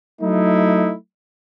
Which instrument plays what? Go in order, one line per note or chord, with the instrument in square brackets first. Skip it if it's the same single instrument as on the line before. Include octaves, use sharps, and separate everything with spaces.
[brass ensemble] F#3 A3 D#4 E4